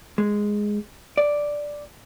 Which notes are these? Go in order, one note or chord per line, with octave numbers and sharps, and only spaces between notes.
G#3
D5